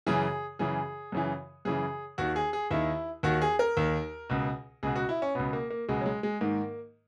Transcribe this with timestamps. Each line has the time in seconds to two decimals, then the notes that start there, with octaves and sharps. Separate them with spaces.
0.07 F#2 C#3 E3 G#4
0.59 F#2 C#3 E3 G#4
1.12 F#2 C#3 E3
1.65 F#2 C#3 E3 G#4
2.18 D#2 D#3 F#4
2.36 G#4
2.53 G#4
2.71 D#2 D#3 E4
3.23 D#2 D#3 F#4
3.42 G#4
3.59 A#4
3.77 D#2 D#3
4.29 C#2 B2
4.83 C#2 B2 G#4
4.96 F#4
5.09 E4
5.22 C#4
5.35 C#2 B2 B3
5.53 A#3
5.70 A#3
5.89 C#2 B2 G#3
6.01 F#3
6.06 G#3
6.23 G#3
6.41 G#2 D#3 A#3